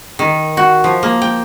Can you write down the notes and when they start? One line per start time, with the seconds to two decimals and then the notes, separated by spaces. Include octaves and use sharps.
0.19 D#3
0.57 F#4
0.84 F3
1.03 A#3
1.22 G5